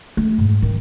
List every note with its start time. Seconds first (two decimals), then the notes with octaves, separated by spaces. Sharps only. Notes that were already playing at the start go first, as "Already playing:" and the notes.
0.17 A3
0.39 G#2
0.62 D#3